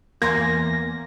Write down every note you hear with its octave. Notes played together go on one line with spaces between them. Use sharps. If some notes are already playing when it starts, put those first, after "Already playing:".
E2 A#3 G#5 C6 G#6 A#6